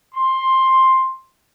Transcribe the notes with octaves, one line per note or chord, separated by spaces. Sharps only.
C6